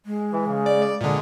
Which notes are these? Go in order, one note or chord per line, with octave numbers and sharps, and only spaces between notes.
G#3
E3
C#3
D5
A#2 D3 G#3